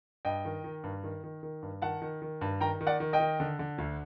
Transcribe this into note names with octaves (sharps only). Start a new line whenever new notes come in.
G2 D#5 G5
D#3
D#3
G2
D#3
D#3
D#3
G2
D#3 F#5 A5
D#3
D#3
G2
D#3 G5 A#5
D#3
D5 F#5
D#3
D#5 G5
D#3
D3
D3
D2